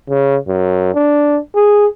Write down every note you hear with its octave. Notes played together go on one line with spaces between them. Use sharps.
C#3
F#2
D4
G#4